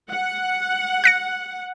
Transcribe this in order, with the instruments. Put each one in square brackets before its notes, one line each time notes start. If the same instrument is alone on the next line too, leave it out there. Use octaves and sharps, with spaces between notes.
[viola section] F#5
[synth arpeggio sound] F#6 A#6 C#7